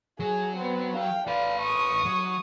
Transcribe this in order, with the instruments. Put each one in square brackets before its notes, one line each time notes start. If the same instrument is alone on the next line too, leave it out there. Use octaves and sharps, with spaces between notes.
[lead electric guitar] F#3 [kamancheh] G#4
[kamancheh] B3 C4
F5 G5
[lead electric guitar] A4 B4 [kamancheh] D5 F5
[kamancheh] C#6 D#6
[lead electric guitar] F#3